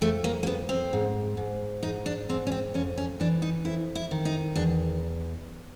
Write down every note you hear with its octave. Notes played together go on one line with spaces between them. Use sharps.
F2 A3
A#3
A#3
F2 B3
C4
G#2
G#2
G#2 D#4
D4
G#2 C4
C#4
C4
F2 C#4
C#4
E3 D4
D#4
F2 E4
E4
D#3
D#4
E2 D4